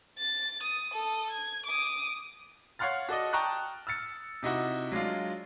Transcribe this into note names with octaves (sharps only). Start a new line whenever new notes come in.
A6
D#6
A4 D#6
G#6
D6 D#6
C#5 F5 F#5 C6 F6 A6
F#4 A4 D5 D#5
G5 A5 A#5 C#6 D#6 F#6
E6 F6 A6 C#7
C3 D#4 E4 F#4
F#3 G#3 D4 F4